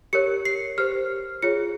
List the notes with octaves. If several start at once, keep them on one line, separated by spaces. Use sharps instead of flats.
G4 A#4 C#5 C#7
C7
G4 C5 F6
F4 G#4 C#5 C#7